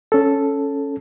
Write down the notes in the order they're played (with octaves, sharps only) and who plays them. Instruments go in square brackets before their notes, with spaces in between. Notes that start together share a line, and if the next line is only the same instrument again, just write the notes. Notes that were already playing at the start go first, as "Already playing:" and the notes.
[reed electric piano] C#4 A4